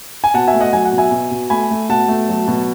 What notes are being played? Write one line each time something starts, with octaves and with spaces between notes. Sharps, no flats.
G#5
B2 F#5 A5
E5 G#5
A3
D#5 F#5
F#3 G#5
F#5
B2
E5 G#5
B2
B2
A3 G#5 B5
A3
B2 F#5 A5
A3
F#3
B2